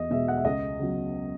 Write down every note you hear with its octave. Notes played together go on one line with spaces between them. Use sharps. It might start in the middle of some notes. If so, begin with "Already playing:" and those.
Already playing: E2 D#5
B2 G#3 E5
F#5
E5
C#2 D#5
C#3 F#3 B3